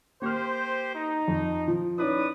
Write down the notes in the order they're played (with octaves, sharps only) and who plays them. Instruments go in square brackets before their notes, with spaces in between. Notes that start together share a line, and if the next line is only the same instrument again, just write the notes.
[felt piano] A#3 F6 [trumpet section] G4 C5
[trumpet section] D#4
[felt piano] F2
F3
[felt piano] C#4 D#4 E4 [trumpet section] B4 D5 D#6